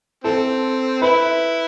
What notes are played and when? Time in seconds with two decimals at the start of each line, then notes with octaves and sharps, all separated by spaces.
0.24 E3 C4 A4
1.01 E4 B4